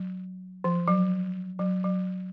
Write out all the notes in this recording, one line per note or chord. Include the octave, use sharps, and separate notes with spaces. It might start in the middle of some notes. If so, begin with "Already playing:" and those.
Already playing: F#3
F3
F#3
F#3
F#3